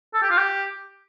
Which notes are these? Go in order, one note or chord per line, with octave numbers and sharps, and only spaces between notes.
A4
G4
F4
G4